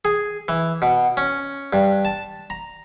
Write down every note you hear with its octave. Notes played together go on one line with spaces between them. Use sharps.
G#4
E3
B2
C#4
G2
A5
A#5